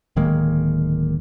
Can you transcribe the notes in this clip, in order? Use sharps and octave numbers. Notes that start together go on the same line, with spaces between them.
D1 D#3 G#3 A#3